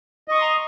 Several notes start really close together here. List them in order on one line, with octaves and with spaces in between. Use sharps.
D#5 C#6 D#6 C6 A#5